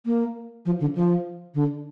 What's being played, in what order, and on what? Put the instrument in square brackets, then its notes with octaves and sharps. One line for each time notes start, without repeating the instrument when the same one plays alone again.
[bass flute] A#3
F3
D3
F3
D3